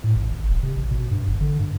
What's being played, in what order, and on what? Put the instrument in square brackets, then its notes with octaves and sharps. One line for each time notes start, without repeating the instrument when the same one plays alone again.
[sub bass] A2
A1
G#1
D1
C3
A1
B2
G2
G#1
D3
G2